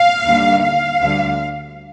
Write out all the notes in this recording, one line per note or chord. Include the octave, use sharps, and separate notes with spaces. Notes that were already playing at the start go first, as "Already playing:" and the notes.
Already playing: F5
D#2 D3 G3 A#3
F5
D2 D3 G3